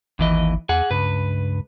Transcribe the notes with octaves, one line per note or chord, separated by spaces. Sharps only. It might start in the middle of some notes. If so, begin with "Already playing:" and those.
G#1 D#2 E3 D#5
E2 G#4 F#5
C#2 G2 B4